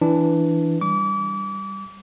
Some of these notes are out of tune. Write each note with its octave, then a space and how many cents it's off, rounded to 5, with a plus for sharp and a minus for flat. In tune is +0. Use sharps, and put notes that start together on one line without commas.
E3 +0 D4 +0
G3 +0 D6 -35